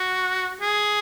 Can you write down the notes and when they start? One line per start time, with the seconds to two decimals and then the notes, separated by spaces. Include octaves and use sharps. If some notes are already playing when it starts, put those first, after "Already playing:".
Already playing: F#4
0.61 G#4